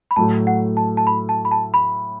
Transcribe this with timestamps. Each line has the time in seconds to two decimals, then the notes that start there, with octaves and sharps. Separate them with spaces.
0.11 B5
0.16 A2 F#3 A3 A5
0.47 F#5
0.77 A5
0.97 A5
1.07 B5
1.29 A5
1.45 B5
1.51 A5
1.74 B5